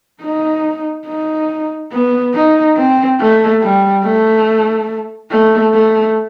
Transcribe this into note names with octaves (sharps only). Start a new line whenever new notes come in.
D#4
D#4
B3
D#4
C4
A3
G3
A3
A3
A3